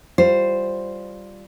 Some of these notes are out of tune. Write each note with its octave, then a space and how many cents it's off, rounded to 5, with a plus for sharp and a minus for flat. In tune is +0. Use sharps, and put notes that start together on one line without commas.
G3 +0 F4 +0 C5 +0